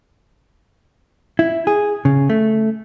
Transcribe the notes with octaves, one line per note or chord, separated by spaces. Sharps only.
E4
G#4
C#3
A3